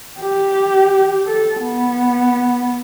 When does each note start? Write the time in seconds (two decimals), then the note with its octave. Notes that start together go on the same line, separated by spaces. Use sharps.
0.21 G4
1.26 A4
1.61 B3